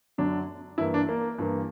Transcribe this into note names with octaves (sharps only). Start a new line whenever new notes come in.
F#2 D3 F#3 D4
G2 E3 A#3 E4
D4
A#3
G2 E3 A#3